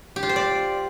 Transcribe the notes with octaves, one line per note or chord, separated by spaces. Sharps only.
G4
F4
C5
D5